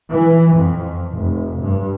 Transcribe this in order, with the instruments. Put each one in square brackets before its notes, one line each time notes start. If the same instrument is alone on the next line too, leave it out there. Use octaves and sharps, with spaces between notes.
[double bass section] E3
F2
F1
G2